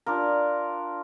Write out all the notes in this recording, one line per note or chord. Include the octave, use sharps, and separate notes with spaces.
D4 F4 A#4